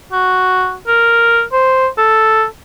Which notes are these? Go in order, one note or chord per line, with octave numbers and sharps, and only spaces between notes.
F#4
A#4
C5
A4